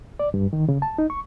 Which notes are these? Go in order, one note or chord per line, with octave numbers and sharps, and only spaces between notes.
D5
G2
D#3
C#3
A5
D#4
C#6